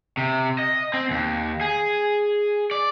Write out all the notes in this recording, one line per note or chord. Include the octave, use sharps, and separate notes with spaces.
C3
D#5
C4
D#2
G#4
D5